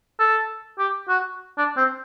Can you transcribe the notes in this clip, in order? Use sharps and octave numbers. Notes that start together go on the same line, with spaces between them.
A4
G4
F#4
D4
C4